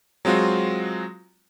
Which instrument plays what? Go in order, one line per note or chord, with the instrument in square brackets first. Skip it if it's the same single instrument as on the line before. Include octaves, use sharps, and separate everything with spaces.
[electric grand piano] F#3 G#3 C4 F4 F#4